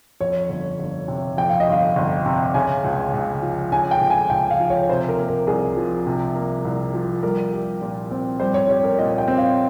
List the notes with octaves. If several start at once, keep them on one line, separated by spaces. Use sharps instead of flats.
F2 C#5
G1
G1
C3
F2 G5
F5
D#5
G1 F5
G1
C3
C#3 G#5
C#2
C#2
F3
C#3 G#5
G5
C#2
G#5
C#2 G5
F5
F3
C#5
C3 C5
A#4
A#3
A#4
C2 G#4
F3
C3
A#3
C2
F3
G3 A#4
G4
A#2
C4
G3 C5
C#5
G4 C#5
A#4
A#2 D#5
G5
C4
F5